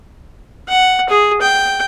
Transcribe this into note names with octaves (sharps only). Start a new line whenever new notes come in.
F#5
G#4
G5